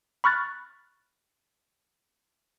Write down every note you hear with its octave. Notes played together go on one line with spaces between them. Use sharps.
B5 C#6 F6 F#6 A6